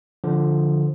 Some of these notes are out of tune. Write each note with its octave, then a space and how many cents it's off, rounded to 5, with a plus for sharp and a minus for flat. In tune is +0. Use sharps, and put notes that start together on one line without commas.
D3 +0 F3 +0